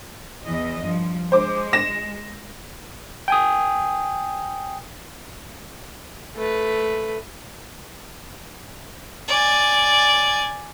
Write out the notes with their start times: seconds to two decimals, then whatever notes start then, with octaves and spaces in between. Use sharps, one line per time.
0.45 E2 E3 D#5
0.83 G2 F3
1.32 G#3 C5 D6
1.73 A#6 E7
3.28 G5 G#5 D#6
6.36 A3 B4
9.28 D5 G#5